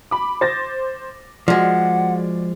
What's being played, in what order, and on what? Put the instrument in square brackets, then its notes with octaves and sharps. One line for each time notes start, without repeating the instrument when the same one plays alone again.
[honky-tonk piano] B5 D6
C5 A6 A#6
[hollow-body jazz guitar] F3 G#3 [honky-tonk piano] F#4 D5 [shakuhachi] F#5